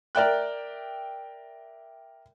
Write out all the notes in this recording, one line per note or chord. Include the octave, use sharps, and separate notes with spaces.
A#4 D5 E5 G5 F#6